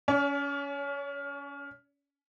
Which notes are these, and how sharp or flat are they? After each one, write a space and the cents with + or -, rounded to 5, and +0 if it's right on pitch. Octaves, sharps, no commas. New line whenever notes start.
C#4 +25 D5 -45